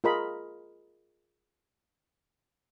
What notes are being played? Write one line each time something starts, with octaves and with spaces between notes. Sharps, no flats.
F4 G#4 A#4 D#5 B5